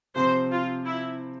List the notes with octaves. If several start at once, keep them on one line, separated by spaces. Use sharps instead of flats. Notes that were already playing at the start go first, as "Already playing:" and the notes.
C3 F3 C4 C5
F4
E4